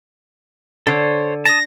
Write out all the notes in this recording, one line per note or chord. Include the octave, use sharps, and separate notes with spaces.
D3 A4 C5 C#5
A5 D#6 A#6